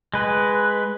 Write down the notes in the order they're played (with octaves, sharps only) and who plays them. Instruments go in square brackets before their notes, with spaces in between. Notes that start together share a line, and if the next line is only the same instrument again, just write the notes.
[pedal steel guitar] G#3 B4